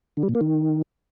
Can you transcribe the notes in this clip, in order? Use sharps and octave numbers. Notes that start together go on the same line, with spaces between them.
D3
G3
A#2
A#3
D#3